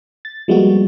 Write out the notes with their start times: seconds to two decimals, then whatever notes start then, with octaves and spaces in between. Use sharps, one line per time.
0.25 A6
0.48 F3 G3 G#3 A#3 B3 F#4